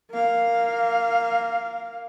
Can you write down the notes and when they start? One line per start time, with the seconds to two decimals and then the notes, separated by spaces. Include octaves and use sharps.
0.11 A#3 F5